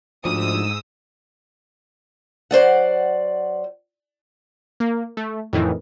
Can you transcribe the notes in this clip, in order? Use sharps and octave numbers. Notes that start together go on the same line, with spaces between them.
D2 G#2 F3 D#6 E6
F#3 C5 D5 F#5
A#3
A3
F2 A2 D#3 E3